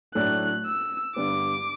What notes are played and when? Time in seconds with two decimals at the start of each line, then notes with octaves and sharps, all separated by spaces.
0.15 A2 F#3 A3 D4 F#6
0.66 E6
1.16 G2 D3 G3 B3 D6